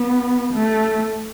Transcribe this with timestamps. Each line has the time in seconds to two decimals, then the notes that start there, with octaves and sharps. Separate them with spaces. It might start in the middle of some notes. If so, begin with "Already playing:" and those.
Already playing: B3
0.53 A3